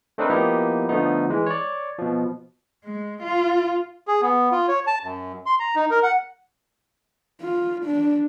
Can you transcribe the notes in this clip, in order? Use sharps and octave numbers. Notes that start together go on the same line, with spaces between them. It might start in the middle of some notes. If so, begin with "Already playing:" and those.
A3 C4 D4 D#4 A#4 B4
F3 A#3 B3 D#4 E4 G4
D3 F3 A3 B3 D#4
E3 G#3
C#5 D5
B2 F3
G#3
F4
G#4
B3
F4
C#5
A5
F#2
C6
A#5
D#4
A#4
F#5
F4
D4